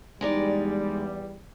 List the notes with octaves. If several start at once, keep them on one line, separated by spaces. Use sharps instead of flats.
E2 G3 G#3 D#4 D5